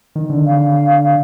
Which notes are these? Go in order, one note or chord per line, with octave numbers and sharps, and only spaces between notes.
D#3
D3
F5